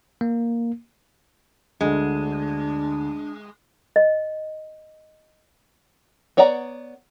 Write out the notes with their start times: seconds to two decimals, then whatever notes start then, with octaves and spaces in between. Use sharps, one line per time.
0.21 A#3
1.81 D2 D3 G#3 D4
3.96 D#5
6.37 B3 C#5 D5 F#5 A#5